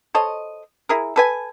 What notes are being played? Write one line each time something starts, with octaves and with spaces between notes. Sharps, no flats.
A4 C5 C#5 D#5
E4 G#4 A#4
A4 B4 G#5